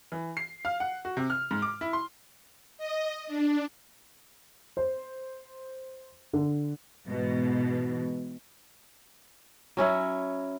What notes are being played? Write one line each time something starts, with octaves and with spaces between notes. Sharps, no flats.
E3
C7
F5
F#5
F#4
C3
F6
G#2
D6
E4
C6
D#5
D4
C5
D3
G#2 B2 E3
F#3 C#4 E4